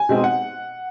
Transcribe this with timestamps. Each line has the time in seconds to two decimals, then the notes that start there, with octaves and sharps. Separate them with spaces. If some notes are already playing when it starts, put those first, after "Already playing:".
Already playing: G#5
0.09 B2 G#3 C4 D#4
0.24 F#5